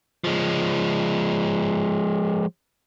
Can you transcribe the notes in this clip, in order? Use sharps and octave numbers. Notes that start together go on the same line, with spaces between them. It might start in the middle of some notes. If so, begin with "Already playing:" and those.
F3 G#3